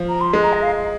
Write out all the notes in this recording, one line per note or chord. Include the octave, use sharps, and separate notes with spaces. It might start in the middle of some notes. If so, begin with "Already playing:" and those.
Already playing: F3
A#5
C6
G#3
A#5
D#5
F5